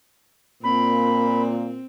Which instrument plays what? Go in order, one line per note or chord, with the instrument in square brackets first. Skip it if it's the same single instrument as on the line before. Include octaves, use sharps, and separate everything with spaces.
[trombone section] A#2 [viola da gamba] C4 [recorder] B5